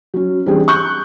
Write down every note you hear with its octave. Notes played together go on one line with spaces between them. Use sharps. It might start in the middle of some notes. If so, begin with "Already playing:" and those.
F#3 C#4
E3 G3 C4 D4 G4 G#4
C#6 F#6 G6